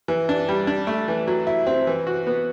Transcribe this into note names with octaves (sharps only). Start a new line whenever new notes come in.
E3
D4
G3
D4
A3
E3
F#3
E4
C4
E3
F#4
B3